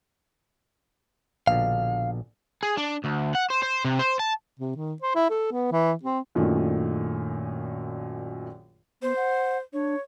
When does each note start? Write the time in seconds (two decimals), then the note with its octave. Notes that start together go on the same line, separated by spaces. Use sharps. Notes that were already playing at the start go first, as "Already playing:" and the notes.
1.47 A#1 B2 D3 F5
2.63 G#4
2.78 D4
3.05 D2
3.35 F#5
3.50 C5
3.63 C5
3.85 C3
3.99 C5
4.20 A5
4.60 C3
4.76 D#3
5.02 C5
5.15 E4
5.30 A4
5.52 B3
5.72 E3
6.03 C4
6.35 A#1 F#2 A#2 D#3 A3
9.02 B3 C5
9.16 F#5
9.73 D4 C#5